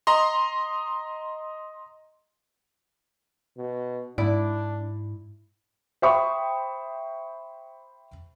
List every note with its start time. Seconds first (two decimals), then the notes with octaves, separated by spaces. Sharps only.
0.07 D#5 A#5 C6
3.58 B2
4.18 G#2 D4 E4 D5 D6
6.02 C5 E5 G5 B5 C#6 D#6